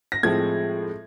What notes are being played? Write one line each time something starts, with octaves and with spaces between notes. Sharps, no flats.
A#6
A2 F3 G#3 C4 G#6